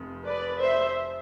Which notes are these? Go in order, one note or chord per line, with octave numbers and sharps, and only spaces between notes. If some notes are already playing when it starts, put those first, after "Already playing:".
Already playing: F1 F2
B4 D5
C5 E5